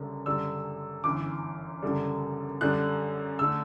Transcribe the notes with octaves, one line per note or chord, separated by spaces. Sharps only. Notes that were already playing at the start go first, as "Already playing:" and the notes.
Already playing: F#1 F#2 D3 G3
F#1 F#2 D3 G3 E6
G1 F#2 E3 D6
F#1 F#2 D3 G3
F#2 D3 G3 F#6
D3 A3 E6